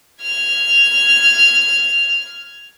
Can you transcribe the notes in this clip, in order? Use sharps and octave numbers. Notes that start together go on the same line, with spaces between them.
F6 G#6